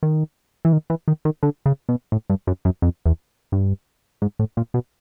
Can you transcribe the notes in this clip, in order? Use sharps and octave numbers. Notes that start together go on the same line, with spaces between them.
D#3
E3
D#3
E3
D#3
D#3
D3
C#3
B2
A2
G2
F#2
F#2
F2
E2
G2
G#2
A2
A#2
B2